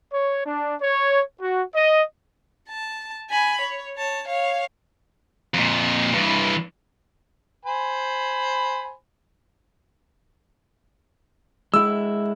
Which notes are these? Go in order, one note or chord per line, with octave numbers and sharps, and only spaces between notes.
C#5
D4
C#5
F#4
D#5
A5
G#5 B5
C#5
C#5 A5
C#5 F5
F2 A#2
G2 E3
C5 G#5 B5
G#3 E4 E6